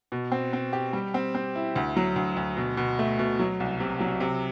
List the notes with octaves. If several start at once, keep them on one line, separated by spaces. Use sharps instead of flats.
B2
C4
C4
G4
G3
C4
C4
E4
D2
F#3
D2
D2
B2
B2
A3
B2
F#3
C2
C3
F#3
C3